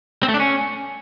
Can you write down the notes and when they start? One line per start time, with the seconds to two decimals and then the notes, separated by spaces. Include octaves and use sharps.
0.23 C4
0.29 A3
0.34 D4
0.40 C#4